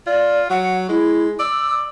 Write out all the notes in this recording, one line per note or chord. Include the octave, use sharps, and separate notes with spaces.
F4 D5
F#3 F#5
G#3 E4
D5 E6